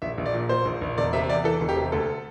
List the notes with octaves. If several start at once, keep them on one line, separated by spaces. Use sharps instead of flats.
A#1 E5
A#1
D5
A#2
A#2 C5
A#1
A#1
E1 D5
C3 E5
E2 D5
E3 A4
E1
G4
C3
D2 A4